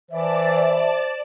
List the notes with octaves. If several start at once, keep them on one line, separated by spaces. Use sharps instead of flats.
E3 C5 D5 E5 A5